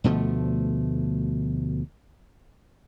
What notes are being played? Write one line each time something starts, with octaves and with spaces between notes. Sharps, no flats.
D2 B2 F3 A3